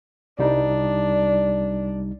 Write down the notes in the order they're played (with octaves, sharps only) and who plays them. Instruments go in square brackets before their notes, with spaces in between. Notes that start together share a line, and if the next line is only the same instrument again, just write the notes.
[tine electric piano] C2 G3 D#4 [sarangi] D4